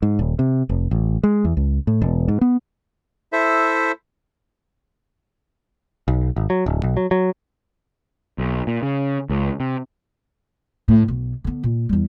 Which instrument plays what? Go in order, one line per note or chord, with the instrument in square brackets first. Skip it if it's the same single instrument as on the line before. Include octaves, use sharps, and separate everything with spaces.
[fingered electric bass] G#2
D#1
C3
F1
A1
G#3
E2
C#2
A2
E1
G#2
B3
[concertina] E4 A4 C5 E5
[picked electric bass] B1
G#1
F#3
D1
B1
F#3
F#3
B1
A#2
C#3
C#2
C3
[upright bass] A2
B1 B2
D3 B3
A#2
E2 G3